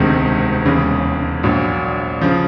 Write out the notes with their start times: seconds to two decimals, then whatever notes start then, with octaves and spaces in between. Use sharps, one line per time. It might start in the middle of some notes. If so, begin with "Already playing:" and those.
Already playing: E1 D2 C3 D#3 G#3
0.66 E1 D#2 C#3 E3
1.43 A#1 A#2 F#3
2.21 C#3 F3